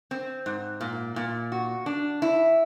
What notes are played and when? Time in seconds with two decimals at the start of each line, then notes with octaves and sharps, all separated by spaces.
0.11 C4
0.46 G#2
0.81 A#2
1.16 A#2
1.52 F#4
1.86 D4
2.22 E4